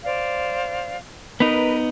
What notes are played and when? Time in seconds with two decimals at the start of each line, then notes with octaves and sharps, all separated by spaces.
0.04 C5 D5 F5
1.40 B3 D#4 A#4 B4 D#5